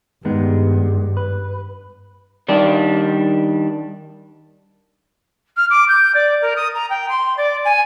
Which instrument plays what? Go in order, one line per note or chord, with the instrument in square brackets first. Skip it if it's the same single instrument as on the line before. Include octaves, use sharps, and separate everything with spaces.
[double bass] G2 [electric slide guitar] D#3 G#3 B3
[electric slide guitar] B4
D#3 G3 D4
[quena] F6
D6
G6
D5
A#4
D#6
A#5
G5
C6
D5
G#5